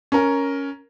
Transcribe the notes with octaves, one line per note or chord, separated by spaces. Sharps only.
C#4 A#4